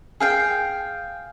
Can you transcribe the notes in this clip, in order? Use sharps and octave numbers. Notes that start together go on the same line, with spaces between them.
G#4 F5 G5